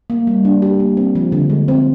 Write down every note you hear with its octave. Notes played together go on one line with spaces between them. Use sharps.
A#3
G3
D4
G4
A#3
C4
F3
D3
G#3
C4